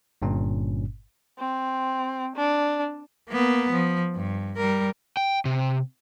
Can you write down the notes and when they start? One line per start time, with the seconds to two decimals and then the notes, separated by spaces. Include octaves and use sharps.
0.22 G1 G2 A#2 C#4
1.39 C4
2.36 D4
3.29 A#3 B3
3.72 F3
4.16 G2
4.57 G3 A#4
5.17 G5
5.45 C3